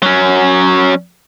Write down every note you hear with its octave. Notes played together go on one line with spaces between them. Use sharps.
F#3 C#4